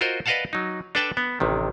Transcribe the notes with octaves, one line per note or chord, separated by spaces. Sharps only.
F4 F#4 A#4 C5 D#5
B4 D5 D#5 F5 F#5 A5
F#3 D#4
D4 A4 B4 D5 G5 A5
B3
A1 C3 D#3